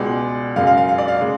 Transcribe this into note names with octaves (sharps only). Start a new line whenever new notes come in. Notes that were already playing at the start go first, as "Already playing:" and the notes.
Already playing: C#2 B2 G#3 D5
F#2 C#3 G#3 F5
F5
F5
F5
D5
F5
C#3 G#3